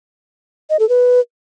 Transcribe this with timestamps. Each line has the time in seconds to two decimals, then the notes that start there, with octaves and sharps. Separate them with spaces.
0.70 D#5
0.79 A4
0.89 B4